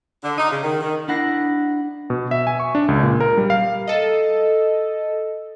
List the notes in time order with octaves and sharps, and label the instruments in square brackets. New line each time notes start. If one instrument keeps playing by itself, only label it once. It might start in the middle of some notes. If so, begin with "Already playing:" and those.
[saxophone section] D3
D#4
C#3
D#3
D#3
[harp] D4 E4 F#5 F#6 A#6 C7
[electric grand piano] B2
E5
G#5
C#6
D4
C#2
A#2
A#4
G3
F5
[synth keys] A4 D#5